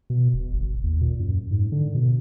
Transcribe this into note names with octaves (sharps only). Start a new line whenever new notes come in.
B2
D#1
G1
D#2
A#2
F#2
G#2
D3
B2